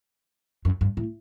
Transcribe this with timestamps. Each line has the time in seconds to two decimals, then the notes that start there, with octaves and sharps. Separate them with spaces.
0.65 F#2
0.81 G2
0.97 A2